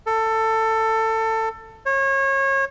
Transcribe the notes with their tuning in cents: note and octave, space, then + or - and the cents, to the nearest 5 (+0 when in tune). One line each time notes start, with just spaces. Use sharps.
A4 +20
C#5 -30